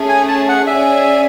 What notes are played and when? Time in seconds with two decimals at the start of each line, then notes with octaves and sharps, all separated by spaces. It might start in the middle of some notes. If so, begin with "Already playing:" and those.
Already playing: A3 C#4 G#4
0.09 G#5
0.28 A5
0.49 F#5
0.67 C#4 G#4 D5 E5 G#5